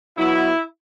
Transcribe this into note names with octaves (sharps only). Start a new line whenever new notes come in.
B2 F#3 B3 E4